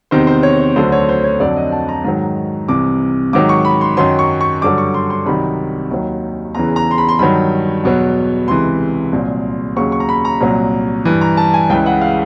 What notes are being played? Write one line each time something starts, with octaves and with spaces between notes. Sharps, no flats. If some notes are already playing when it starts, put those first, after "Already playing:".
E2 C3 D#3 C5
C5
C#5
C#5
D2 D3 F#3 C5
C#5
C5
C#5
F2 D3 F#3 D5
D#5
A5
A#5
G#2 D#3 F#3
C2 C3 E3 D6
G#2 D#3 F#3 D6
C#6
B5
C6
F#2 D#3 F#3 C6
C#6
C#6
G2 D3 F#3 D6
C#6
C6
C6
C2 C3 D#3 F#3 B5
D#2 D#3 F#3
E2 C#3 E3 A#5
A#5
C6
B5
C6
G2 D#3 F#3 B5
E2 B2 F#3
C#2 C3 E3 C6
C2 A#2 F#3
D#2 C#3 F#3 C#6
C#6
A#5
B5
A#5
C2 A#2 F#3
G2 E3
A#5
A5
G#5
C#2 C#3 E3 G5
F#5
F5